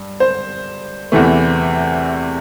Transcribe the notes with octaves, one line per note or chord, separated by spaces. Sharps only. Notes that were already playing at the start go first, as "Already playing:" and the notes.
Already playing: G2
C5
E2 C3 E3 A3